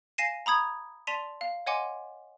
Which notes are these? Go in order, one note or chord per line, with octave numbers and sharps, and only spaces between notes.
F5 G#5 A#6 C7 D#7 E7
A#5 B5 D#6 G#6
D5 A5 C6 B6 D#7 F7
F5
C#5 D#5 F#5 G#5 C6 D6